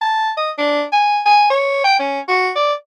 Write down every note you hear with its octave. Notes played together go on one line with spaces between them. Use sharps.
A5
D#5
D4
G#5
G#5
C#5
G5
C#4
F#4
D5